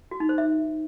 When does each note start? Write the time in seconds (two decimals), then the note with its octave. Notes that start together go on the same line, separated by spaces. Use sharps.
0.11 F#4
0.20 D#4
0.29 C5
0.38 E5